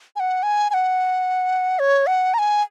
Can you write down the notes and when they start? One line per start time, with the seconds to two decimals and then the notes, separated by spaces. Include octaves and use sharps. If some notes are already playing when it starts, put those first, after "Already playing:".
0.16 G#5
0.20 F#5
0.43 G#5
0.70 G#5
0.74 F#5
1.79 C#5
2.07 F#5
2.34 A#5
2.39 G#5